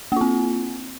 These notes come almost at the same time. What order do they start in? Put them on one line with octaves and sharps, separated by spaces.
A#3 F4 C4